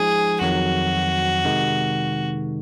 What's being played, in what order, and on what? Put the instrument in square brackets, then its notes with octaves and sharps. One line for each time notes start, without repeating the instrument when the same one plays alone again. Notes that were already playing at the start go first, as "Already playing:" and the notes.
Already playing: [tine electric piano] F3 G#3 D#4 [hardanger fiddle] G#4
[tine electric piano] F2 D#3 F#3 [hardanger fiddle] F#4
[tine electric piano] C3 D#3 G#3 D#4